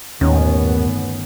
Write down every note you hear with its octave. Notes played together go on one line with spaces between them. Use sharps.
G1 D#2 A2 D#3 B3 C#4